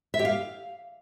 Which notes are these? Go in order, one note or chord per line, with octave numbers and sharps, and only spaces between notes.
E5
G4
F5